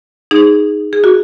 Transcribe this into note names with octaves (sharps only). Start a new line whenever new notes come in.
D#4 G#4
G#4
F#4